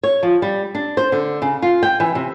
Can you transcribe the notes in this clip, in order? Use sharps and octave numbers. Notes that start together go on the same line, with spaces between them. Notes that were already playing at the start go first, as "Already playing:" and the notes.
C#5
F3
G3
D4
C5
D3
C#3
F4
G5
E3
C3